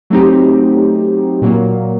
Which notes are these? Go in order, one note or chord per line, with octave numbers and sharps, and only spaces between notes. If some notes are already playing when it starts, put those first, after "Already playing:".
F#3 A3 C4 D#4 G4
A#2 F#3 A#3